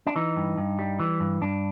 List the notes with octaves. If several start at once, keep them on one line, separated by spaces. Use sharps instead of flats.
D4
E3 D#4
G2
G2
G3
E3
G2
G2 D4